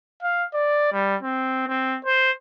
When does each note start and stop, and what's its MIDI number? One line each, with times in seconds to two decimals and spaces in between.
0.23 0.45 77
0.54 0.90 74
0.92 1.16 55
1.23 1.63 60
1.68 1.98 60
2.05 2.31 72